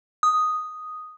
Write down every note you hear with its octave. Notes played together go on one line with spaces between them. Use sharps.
D#6